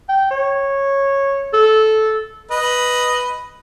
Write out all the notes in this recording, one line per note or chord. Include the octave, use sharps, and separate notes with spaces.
G5
C#5
A4
B4 D#5